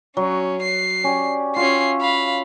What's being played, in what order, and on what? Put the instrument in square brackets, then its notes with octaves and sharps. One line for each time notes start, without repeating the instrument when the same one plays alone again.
[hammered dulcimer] F#3 [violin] C#4
[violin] C7
[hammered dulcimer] C#4 G4 D5
[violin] C#4 C7 [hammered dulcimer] F4 F#4 E5
[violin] F5 B5